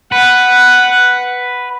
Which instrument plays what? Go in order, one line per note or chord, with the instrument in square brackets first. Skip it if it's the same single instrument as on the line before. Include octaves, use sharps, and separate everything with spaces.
[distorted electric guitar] B4 [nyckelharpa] F#5